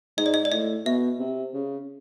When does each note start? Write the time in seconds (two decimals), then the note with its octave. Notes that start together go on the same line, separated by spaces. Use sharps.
0.18 G#2 D#5
0.26 D5
0.34 D#5
0.45 D5
0.52 A2 D#5
0.86 B2 E5
1.19 C3
1.54 C#3